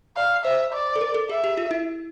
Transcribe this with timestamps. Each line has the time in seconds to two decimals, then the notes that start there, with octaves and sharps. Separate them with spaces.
0.17 D5 F5
0.44 C5 E5
0.73 D5
0.96 A4
1.01 A#4
1.14 A4
1.29 G#4 E5
1.44 G4
1.57 F4
1.71 E4